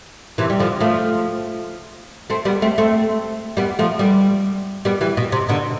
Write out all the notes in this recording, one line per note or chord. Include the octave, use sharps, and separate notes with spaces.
C3 E3
G3
D3 F3
F3 A3
A3 C4
G3 B3
A3 C4
A3 C4
G3 B3
F3 A3
G3 B3
G3 B3
E3 G3
B2
C3
B2 D3